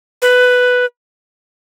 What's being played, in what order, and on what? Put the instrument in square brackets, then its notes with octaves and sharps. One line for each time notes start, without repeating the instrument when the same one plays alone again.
[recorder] B4